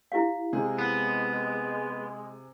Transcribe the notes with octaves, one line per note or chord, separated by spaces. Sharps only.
E4 G4 F5
C3 G#3 G#4
B3